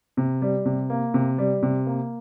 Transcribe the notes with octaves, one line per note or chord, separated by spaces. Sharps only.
C3
G3
C3
A#3
C3
G3
C3
A#3